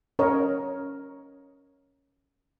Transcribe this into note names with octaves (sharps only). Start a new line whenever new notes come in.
C#4 A#4 C#5 D#5